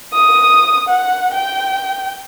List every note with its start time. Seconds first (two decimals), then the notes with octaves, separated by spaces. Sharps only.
0.14 D#6
0.89 F#5
1.34 G5